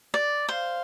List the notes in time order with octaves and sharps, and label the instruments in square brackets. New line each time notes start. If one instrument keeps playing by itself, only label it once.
[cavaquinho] D5
[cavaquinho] C5 [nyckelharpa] F5